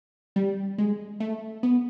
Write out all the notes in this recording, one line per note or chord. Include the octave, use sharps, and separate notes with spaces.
G3
G#3
A3
B3